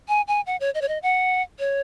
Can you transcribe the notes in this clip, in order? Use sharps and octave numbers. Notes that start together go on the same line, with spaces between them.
G#5
G#5
F#5
C#5
D#5
C#5
D#5
F#5
C#5